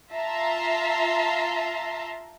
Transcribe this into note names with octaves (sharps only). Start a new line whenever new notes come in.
F4 E5 A5 A#5 C6